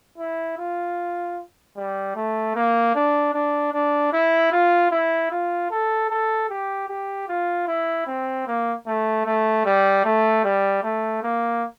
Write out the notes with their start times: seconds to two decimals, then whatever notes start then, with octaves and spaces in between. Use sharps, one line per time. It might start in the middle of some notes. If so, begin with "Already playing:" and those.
0.18 E4
0.58 F4
1.76 G3
2.16 A3
2.55 A#3
2.95 D4
3.34 D4
3.73 D4
4.13 E4
4.52 F4
4.91 E4
5.31 F4
5.71 A4
6.10 A4
6.50 G4
6.89 G4
7.28 F4
7.67 E4
8.07 C4
8.47 A#3
8.87 A3
9.26 A3
9.65 G3
10.05 A3
10.44 G3
10.84 A3
11.23 A#3